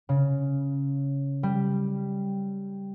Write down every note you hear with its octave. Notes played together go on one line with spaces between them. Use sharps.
C#3
G3